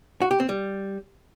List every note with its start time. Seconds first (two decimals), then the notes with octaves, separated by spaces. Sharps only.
0.22 F#4
0.31 G4
0.40 C4
0.49 G3